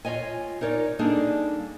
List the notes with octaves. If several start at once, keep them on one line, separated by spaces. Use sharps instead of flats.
F4 C#5 D#5 G#5
D#4 A#4 C#5 D5
G3 A#3 D4 D#4 G#4 A4